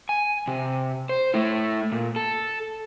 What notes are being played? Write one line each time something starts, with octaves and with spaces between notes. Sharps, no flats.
G#5
C3
C5
A3 E4
A#2
A4